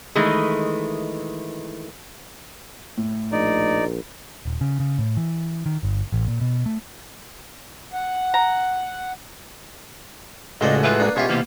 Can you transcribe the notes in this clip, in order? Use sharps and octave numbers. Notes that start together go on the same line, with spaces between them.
D#3 E3 G#3 A3
A2
A#1 D#4 D5
D#1
C#3
C#3
A2
E3
D#3
G1
A1
A#2
B2
A3
F#5
A#5
C#2 A2 G#3 F#4 C5 D5 D#5
E3 F4 B4
A#3 D4
B2 C#4 F4 G4 G#4 E5
C3 E3 A#3 F6